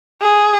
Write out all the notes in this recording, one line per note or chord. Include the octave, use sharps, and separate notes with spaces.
G#4